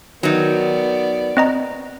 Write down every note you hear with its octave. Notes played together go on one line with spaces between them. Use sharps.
D#3 F#3 B3 D5
C4 D#5 A#5